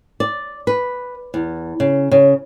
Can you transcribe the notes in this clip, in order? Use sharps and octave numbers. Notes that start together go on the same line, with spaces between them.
D5
B4
E2
C#3
C#3